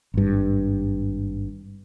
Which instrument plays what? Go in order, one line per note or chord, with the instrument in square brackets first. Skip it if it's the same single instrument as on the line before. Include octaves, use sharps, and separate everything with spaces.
[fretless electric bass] G#1 G2